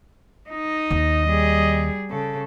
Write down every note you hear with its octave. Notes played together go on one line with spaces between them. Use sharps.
D#4 D#5
D#2
G3 G#4
C#3 A4